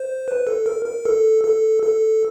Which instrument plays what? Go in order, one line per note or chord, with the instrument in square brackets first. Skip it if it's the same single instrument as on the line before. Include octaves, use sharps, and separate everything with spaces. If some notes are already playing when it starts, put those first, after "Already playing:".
Already playing: [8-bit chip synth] C5
B4
A4
A#4
A#4
A4
A4
A4